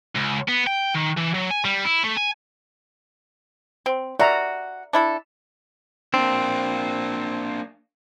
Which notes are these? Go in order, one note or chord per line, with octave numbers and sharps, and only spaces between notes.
C#2
B3
G5
D#3
E3
F#3
G#5
G3
E4
A3
G#5
C4
F#4 D5 E5 A#5
D4 E4 A4
A#3 C4 D4